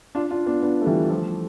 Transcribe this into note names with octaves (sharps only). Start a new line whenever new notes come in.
D4 F4
D4 F4
B3 D4
B3 D4
A3
E3 G3
F3 A3